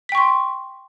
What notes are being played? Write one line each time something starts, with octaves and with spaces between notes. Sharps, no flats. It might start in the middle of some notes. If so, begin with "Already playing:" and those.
G5 C6 C#6 B6